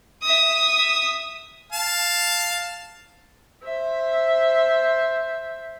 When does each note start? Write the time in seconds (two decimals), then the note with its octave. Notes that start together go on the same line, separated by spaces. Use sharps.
0.22 E5 D#6
1.72 F5 A5
3.63 C5 E5